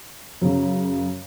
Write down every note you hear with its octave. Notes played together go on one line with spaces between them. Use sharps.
F#2 C#3